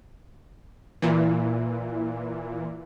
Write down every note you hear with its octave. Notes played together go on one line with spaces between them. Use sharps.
A#2 E3